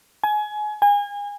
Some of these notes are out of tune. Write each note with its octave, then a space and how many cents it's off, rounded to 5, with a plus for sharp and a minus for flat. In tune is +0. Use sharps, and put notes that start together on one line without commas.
G#5 +25
G#5 -30